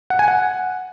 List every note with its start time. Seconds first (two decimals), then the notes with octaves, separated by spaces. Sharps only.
0.10 F#5
0.19 G#5
0.28 F#5